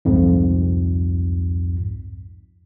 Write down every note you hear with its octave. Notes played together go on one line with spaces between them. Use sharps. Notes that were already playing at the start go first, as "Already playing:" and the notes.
C2 F2 G#2